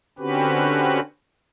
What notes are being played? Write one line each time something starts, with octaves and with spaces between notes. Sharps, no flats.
D3 C4 C#4 F#4 G4 B4